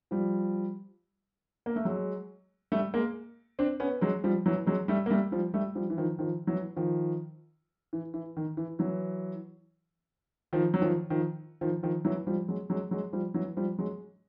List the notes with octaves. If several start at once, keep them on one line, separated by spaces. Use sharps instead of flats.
F3 G3
A#3
A3
F#3 G#3
G3 A3
G#3 A#3
C4 D4
B3 C#4
F#3 G#3
F3 G3
E3 F#3
F#3 G#3
G3 A3
A#3
G3 A3
F3 G3
G3 A3
F3 G3
E3
D#3 F3
D#3 F3
E3 F#3
D#3 F3
E3
E3
D#3
E3
E3 F#3
D#3 F3
F#3
D#3 F3
D#3 F3
D#3 F3
D#3 F3
E3 F#3
F3 G3
F#3 G#3
F#3 G#3
F#3 G#3
F3 G3
E3 F#3
F3 G3
F#3 G#3